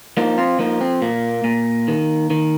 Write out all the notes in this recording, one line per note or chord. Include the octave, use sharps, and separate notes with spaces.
F3 A#3 D#4
C4 F4
F3 A#3 D#4
C4
A#2 A#3
A#2
D#3
D#3